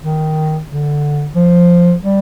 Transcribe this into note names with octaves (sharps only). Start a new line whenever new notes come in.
D#3
D3
F3
G3